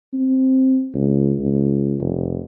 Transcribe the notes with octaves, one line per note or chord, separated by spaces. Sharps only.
C4
C#2
C#2
F1